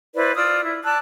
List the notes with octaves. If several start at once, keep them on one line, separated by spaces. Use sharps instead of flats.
E4 B4 C5 D5
F4 D5 D#6 E6
E4
D5 A5 E6 F#6